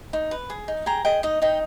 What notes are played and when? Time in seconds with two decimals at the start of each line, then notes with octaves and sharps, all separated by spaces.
0.13 D#4
0.31 B4
0.50 G#4
0.68 D#4
0.86 G#4 G5 A#5
1.05 G#4 D#5 G5
1.23 D#4 D#5
1.42 D#4 D#5 G5